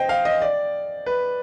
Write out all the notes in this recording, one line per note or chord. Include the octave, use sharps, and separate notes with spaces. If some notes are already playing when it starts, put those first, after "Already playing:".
Already playing: C5 D#5 G5
F5
D#5
D5
B4